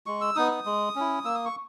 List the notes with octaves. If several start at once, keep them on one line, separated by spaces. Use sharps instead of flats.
G#3 C#6
E6
B3 D#4 D#6
D#6
G#3
C#4 E4
A#3 E6
D#6
C#6